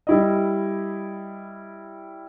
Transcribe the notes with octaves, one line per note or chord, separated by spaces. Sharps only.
G3 E4 D#5